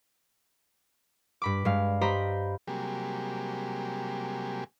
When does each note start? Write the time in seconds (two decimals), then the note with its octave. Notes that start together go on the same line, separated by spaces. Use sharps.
1.42 G2 B5 D6
1.65 G2 G#3 F5
2.01 G4 C5 D#5 A#5 B5
2.67 C3 F#3 G3 A#3 G4 G#4